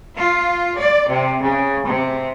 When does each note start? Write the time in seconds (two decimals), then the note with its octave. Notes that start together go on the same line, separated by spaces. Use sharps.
0.16 F4
0.77 D5
1.09 C3
1.41 C#3
1.86 C3